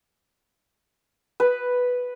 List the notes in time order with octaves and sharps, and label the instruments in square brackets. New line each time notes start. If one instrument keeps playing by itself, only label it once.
[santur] B4